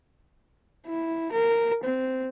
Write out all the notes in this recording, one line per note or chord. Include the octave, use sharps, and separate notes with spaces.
E4
A#4
C4